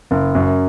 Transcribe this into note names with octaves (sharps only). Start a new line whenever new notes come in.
F#1
F#2